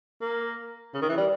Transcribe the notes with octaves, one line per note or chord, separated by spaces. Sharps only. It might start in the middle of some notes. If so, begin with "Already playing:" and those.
A#3
C#3
D#3
E3
G3